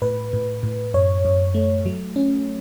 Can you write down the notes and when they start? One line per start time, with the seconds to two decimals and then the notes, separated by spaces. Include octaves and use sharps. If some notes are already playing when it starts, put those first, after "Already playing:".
0.02 A2 B4
0.33 A2
0.63 A2
0.94 F#2 C#5
1.25 F#2
1.54 A3
1.86 F#3
2.16 C#4